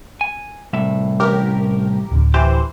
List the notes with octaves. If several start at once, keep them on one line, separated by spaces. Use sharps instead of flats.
G#5
C2 A2 E5
A1 G4 A#4
D1 D3
E3 G4 C5